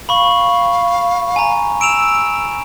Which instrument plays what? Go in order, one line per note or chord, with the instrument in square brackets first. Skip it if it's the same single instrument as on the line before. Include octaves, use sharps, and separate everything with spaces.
[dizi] F5 [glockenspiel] B5 C#6
[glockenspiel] G#5 A#5
[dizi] E6 [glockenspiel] D7 E7 F7